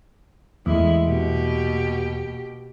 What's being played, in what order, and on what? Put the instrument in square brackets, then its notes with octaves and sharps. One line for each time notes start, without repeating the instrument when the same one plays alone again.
[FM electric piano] E2 [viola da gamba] A2 G#3 E4
[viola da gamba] B2 A#3 G4